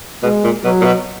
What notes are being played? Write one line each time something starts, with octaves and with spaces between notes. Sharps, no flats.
B2 G#3
A#2
B2 F#3
A#2
B2